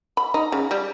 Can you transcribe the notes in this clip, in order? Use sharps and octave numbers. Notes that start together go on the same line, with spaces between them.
B5
D#4
C#3
G3